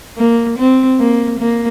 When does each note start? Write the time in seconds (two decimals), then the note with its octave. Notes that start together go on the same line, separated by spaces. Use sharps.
0.18 A#3
0.58 C4
0.99 A#3
1.39 A#3